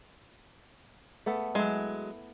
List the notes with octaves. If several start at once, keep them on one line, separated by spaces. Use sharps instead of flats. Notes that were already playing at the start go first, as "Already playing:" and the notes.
A3 B3 A4
F#3 G#3 E4